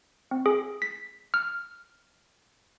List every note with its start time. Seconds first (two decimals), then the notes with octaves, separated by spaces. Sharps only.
0.31 C4
0.46 G#4
0.82 B6
1.34 F6